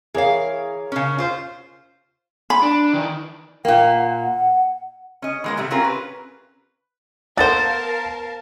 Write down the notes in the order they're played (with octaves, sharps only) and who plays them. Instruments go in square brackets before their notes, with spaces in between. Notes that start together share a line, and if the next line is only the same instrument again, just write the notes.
[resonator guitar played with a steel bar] E3 F5 [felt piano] G#4 A#4 C#5
[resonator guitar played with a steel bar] C#3 C#4
F4 C5
[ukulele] B5
[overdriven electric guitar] D4
D#3 E3
[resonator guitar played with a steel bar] A#2 A#3 [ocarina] G5
[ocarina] F#5
[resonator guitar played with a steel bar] C#4 D#5
E3 G#3 A#3
A2 C3 G3 A3
C4 C#4 F4 G4 G#4 A#4
B4
[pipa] B3 A4 C5 [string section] A#4 F5 A5 [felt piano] A6